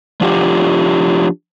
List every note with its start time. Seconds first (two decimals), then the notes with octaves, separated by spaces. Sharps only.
0.21 F3 D4 F4 G4